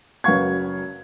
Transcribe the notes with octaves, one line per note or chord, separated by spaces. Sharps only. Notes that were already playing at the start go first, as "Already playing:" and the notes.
F#1 F#3 B4 F5 C#6 G#6